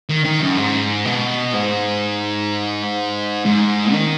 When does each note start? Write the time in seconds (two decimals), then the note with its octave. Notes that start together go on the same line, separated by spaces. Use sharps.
0.09 D#3
0.25 D#3
0.41 F#2
0.57 G#2
1.05 B2
1.53 G#2
3.45 G#2
3.93 D#3